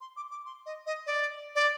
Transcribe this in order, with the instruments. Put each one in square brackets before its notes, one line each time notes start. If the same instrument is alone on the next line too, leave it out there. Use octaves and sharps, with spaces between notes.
[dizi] C6
D6
D6
C6
D#5
D#5
D5
D5